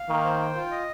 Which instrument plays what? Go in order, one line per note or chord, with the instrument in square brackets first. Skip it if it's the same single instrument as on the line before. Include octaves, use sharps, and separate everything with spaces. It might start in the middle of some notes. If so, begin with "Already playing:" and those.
Already playing: [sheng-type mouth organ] F5
[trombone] D#3 [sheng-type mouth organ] A#3
[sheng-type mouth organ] C5
G5
F4
D#5